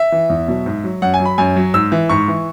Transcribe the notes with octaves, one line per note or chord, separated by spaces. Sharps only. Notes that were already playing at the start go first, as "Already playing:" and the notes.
Already playing: E5
E3
E2
B2 F#3
G#2
F#3
F#2 F#5
G#5
F#3
B5
F#2 G#5
F#3
G#2 E6
E3
G#2 C#6
E3